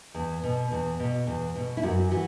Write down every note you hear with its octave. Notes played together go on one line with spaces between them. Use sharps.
E2
B2
E2
B2
E2
B2
E4
F#2 F#4
E3 F#4